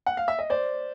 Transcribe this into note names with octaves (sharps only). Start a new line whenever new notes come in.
F#5
F5
E5
D#5
C5 D5